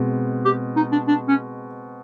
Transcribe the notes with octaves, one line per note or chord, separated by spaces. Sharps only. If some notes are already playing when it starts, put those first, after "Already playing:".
Already playing: B2 G#3 C4
G4
D#4
D4
D4
C#4